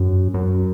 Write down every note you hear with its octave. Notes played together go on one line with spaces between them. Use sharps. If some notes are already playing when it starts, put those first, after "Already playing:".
Already playing: F#2
F#2